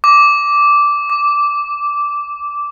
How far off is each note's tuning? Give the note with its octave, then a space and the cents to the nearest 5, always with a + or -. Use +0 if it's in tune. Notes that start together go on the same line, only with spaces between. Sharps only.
D6 -10
D6 +0